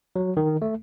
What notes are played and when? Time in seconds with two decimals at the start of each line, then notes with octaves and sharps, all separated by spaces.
0.16 F#3
0.37 D#3
0.62 A3